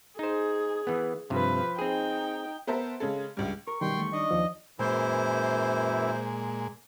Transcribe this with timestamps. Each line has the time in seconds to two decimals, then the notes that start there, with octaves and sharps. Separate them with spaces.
0.19 D#4 G#4 C5
0.87 E3 B3
1.30 G2 C3 F3 B4
1.79 C4 D#4 G#4 G5
2.67 B3 A#4 C5 E5 A5
3.00 C#3 G#3 A4
3.37 C#2 G2
3.67 A#4 C#6
3.81 F#2 B2 D#3 G3 G5 C6
3.97 E2 A3
4.13 D4 D#4 D#5
4.31 D#2 F3
4.79 F#2 A#2 E3 G#3 E4 C5